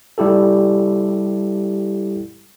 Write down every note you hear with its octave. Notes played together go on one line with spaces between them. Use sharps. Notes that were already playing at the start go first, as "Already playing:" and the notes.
G3 E4 G4 A4